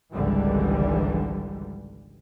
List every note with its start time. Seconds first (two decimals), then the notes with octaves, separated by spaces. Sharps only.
0.12 G#1 C#2 G#2 D3 E3 G3